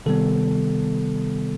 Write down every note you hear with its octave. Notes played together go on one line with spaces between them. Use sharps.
C3 D#3 G3 B3 A4